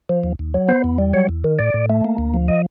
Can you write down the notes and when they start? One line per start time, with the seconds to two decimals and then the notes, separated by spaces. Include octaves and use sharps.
0.09 F3
0.24 D#2
0.39 D#2
0.54 F#3
0.68 B3 C5
0.84 E2
0.98 G3
1.13 F#3 C#5
1.29 E2
1.44 D#3
1.59 A2 D5
1.74 A2
1.90 A3
2.05 A#3
2.18 D2
2.34 F3
2.48 D#5